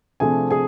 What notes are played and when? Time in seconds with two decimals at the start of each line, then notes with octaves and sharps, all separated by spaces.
0.20 C3 F3 A3 D4 G#4 G#5
0.51 G#4 G#5